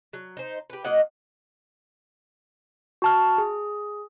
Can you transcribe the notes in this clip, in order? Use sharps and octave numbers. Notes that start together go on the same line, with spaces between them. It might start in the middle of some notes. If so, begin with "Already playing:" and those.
F#3
D#4 C5
G4 B4
F#3 A#3 D#5 F#5
F#4 A5 F6
G#4